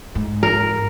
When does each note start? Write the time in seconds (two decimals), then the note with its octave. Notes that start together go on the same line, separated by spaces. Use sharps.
0.15 G#2
0.43 A#4